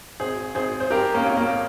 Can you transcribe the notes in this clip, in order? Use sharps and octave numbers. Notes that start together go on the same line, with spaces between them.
G#1 G#4 C5
G#1 G#4 C5
C5
G2 G4 A#4
A#3 C#4
G#1
A#3